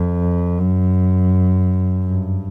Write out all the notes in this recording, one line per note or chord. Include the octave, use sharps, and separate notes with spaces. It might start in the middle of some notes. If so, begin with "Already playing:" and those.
Already playing: F2
F#2
G2